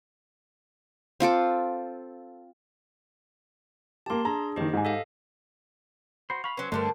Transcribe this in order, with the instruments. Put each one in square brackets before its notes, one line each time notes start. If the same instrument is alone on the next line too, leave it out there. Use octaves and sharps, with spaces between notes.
[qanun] C4 F4 A4 D6
[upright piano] A#3 G4 [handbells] A5 C6
[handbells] D4 G#4 [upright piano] A#5
[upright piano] F#1 D#3 [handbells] G4 C5 D#5
[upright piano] G#2 G#5
[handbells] A4 D#5 F5
[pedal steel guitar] F#4 C5 [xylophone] B5 C6
[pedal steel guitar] F5 B5 [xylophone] C#6
[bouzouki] F#3 C#4 [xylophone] B4 [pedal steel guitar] C5
[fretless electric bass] G2 A3 [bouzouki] D3 G3 D4 [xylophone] A#4 C6